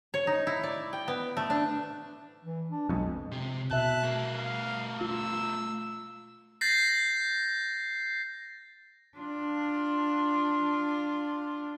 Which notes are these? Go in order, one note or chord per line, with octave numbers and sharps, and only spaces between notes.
C#5
D#4
E4
D5
G5
B3
A3
D4
E3
D4
B1 F2 G#3
C3
B2 E5 A5 F#6
A3 A#4
F5
F4 E6
G6 A6 A#6 C7
D4 F4